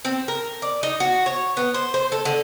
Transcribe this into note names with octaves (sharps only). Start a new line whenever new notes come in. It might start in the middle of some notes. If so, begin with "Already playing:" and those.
C4
A#4
D5
D#4
F#4
C#5
B3
C5
C5
A4
D3